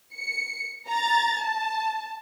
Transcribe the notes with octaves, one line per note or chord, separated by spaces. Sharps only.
C#7
A#5 A6
A5